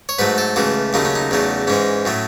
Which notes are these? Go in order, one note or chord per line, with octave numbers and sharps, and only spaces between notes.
C#5
G#2 F#3 A3 B4
A4
C#2 C#3 E3 A3 F#4
D#2 C#3 F#3 A3 D#4
C#4
D#4
E2 C#3 F#3 A3
G#2 E3 G#3 C#4
A2 F#3 A3